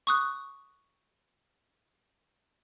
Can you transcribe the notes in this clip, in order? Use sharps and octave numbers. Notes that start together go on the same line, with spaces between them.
C#6 D#6 F#6